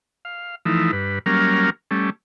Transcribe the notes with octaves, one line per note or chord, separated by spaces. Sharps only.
F5
E3 F3 A3 D#4 E4
G2 B4
F#3 G3 A#3 C#4 A#4 F6
G3 A3 C#4